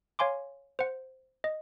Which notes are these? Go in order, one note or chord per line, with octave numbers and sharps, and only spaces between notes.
C#5 F5 G#5 C6 D6
C5 F#5
D#5